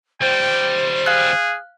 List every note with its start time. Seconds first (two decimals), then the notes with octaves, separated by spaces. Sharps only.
0.21 D#2 G3 C5 G5
1.06 G#4 F5 F#6